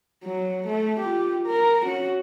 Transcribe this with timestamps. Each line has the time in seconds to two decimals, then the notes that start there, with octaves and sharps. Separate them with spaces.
0.24 F#3
0.67 A3
1.00 F4 G4
1.47 A#4
1.83 C#4 F#4